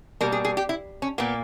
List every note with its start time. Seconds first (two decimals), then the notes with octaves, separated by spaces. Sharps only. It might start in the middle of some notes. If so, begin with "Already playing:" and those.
0.21 B2 G3 A#3 A#4
0.32 G#4
0.45 G#4
0.57 G4
0.69 E4
1.02 C#4
1.18 A#2 A#3 B3